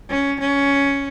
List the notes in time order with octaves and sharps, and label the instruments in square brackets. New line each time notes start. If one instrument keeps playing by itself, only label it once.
[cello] C#4
C#4